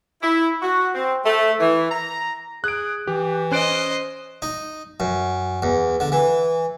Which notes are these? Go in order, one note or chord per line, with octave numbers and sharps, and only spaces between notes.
E4
F#4
C4
A3
E3
A#5
G#4 F#6 D7
E3 G4
C#4 C5 D#5 F#6 D7
D#4
F#2
E2
D3
E3